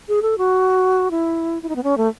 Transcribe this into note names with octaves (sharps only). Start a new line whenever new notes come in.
G#4
A4
F#4
E4
E4
D#4
B3
C#4
A3